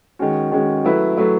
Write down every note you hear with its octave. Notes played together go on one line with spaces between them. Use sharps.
D#3 G#3 C#4 F#4
D#3 G#3 C#4 F#4
F#3 A3 E4 B4
F#3 A3 E4 B4